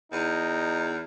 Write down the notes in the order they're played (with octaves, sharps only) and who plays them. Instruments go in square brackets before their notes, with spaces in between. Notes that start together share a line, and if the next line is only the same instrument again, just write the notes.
[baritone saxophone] E2 [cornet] D#4